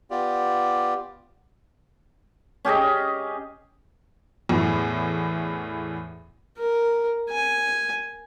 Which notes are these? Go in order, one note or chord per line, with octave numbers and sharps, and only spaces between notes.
B3 F4 G4 D5
C#4 G4 G#4 D#5
E2 A2
A#4
G#5